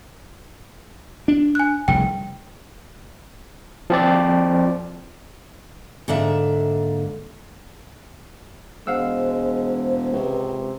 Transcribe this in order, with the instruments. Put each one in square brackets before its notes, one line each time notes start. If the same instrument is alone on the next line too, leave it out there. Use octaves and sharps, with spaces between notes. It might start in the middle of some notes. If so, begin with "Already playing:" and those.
[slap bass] D4
[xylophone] G#5 F#6
[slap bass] F1 C2 C#3 [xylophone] G5
[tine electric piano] F3 C4 D5
[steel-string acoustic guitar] G#2 D3 A#3 E5
[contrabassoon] E1 [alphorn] G#3 [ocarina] C5 [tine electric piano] F5 F#5 E6
[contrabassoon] C#2 [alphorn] C3 [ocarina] B4